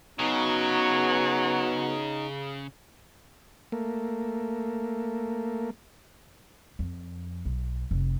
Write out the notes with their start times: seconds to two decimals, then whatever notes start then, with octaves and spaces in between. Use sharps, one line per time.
0.19 C#3 F#3 B3 D#4 F#4
3.72 A3 A#3
6.79 F2
7.45 B1
7.91 F1